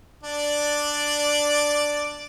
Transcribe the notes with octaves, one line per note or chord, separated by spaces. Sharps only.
D4 D5